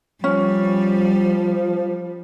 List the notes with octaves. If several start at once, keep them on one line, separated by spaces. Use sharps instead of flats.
F3 G3 C#4